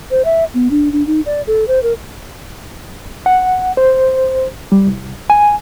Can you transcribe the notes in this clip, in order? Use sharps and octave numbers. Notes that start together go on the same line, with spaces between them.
C5
E5
B3
D4
D4
D#4
D5
A4
C5
A#4
F#5
C5
G3
C2
G#5